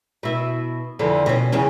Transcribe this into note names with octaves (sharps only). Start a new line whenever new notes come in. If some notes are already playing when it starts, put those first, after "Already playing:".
B2 E4
F2 D3 E3
B2 C#4
E2 C#3 C#4